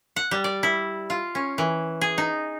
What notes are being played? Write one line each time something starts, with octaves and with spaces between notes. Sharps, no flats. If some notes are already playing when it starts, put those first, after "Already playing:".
F#5
G3
D5
E4
F4
C#4
E3
G#4
D#4